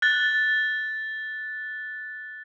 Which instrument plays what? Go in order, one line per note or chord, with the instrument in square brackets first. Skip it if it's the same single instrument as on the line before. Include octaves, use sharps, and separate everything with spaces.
[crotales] F#6 A6